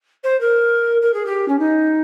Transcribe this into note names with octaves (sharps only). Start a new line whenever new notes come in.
C5
A#4
A#4
G#4
G4
C#4
D#4